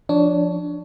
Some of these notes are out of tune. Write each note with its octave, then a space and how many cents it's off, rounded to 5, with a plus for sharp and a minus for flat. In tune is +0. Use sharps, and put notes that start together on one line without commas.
F3 +0 D4 +0 C#5 +20